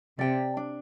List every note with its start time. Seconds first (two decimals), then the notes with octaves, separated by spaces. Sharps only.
0.19 C3 D5 G5
0.57 D4